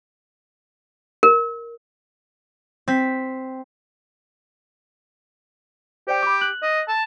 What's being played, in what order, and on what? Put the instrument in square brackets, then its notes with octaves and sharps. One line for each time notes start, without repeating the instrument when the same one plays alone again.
[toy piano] A#4
[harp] C4 B6
[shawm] G4 [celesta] C5 D5 G5
[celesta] B5 D6
F#6 F#7
[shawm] D#5
A5